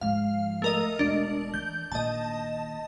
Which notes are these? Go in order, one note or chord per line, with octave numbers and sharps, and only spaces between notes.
G#2 F3 F5
A3 A#4 D#5
E1 D4
E3 G6
A#2 D#3 D#5 A5